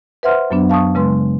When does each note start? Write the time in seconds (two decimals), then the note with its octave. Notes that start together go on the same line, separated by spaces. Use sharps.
0.23 B4 C5 E5 F#5 C6 F6
0.50 F#2 F#3 B3 D4
0.69 F5 A5 C#6 D#6
0.95 C#3 G#3 B4 C6